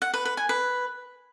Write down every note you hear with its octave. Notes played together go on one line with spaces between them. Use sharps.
F#5
B4
B4
G#5
B4